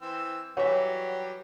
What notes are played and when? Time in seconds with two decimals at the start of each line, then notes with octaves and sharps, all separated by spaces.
0.02 E3 C4 E6
0.57 E3 F#3 G3 F#4 G4 C#5 E5